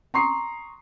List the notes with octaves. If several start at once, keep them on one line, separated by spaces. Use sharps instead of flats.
A#5 C6 C#6 D#6 C7